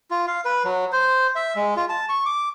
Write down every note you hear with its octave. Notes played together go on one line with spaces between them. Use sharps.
F4
F5
B4
F#3
C5
E5
G#3
F4
A5
C#6
D6